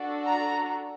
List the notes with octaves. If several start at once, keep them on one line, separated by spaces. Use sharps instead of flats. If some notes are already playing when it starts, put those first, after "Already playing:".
Already playing: D4 F#4 A4
A#5